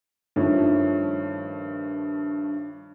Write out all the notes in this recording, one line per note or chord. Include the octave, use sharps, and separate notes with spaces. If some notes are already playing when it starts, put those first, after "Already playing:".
G2 D#3 F3 A3 C#4